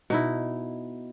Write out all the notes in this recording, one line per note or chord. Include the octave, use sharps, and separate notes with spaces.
B2 D#4 E4